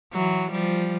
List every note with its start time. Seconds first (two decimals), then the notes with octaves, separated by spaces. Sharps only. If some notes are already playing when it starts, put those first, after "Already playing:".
0.13 E3 F#3
0.52 F3 G3